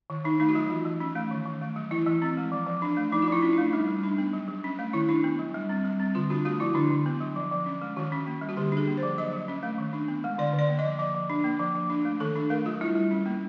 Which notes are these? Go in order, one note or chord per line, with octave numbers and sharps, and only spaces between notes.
D#3
D#3 D#4
A3 D#4
F#4
F#3 F4
E3
E3
C#4
A3
D#3
D#3
A3
F#3
E3 E4
E3
C4
G#3
F3
F3
D4
A3
F3 D#4
F4
F3 E4
C#4
D4
A3
G3 D#4
G3
D4
B3
F#3
F#3
C#4
A3
D#3 E4
D4
B3
F#3
G3
C4
G3
C4
D3 F4
D4 F#4
A3 F#4
F3 E4
D3 D4
D3
B3
F#3
F3
F3
C#4
G#3
D#3 F#4
C#4
A#3
G3
F#4
D3 G4
D4 G#4
A#3
C5
F3
F#3 D#5
F#3
C#4
A3
D#3
D4
B3
G#3
D3 D5
D3
D5
A#3
D#5
F3
F3 D5
F3
D4
A#3
F3
F3
D4
A3
D#3 A4
D4
A3 A#4
F#3 F4
G3 E4
G3
C#4
A#3